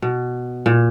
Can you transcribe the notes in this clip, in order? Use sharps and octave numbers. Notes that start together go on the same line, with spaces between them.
B2
A#2